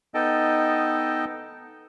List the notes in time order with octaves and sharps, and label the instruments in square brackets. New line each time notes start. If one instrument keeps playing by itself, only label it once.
[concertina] B3 D#4 A4 D#5 G5 A5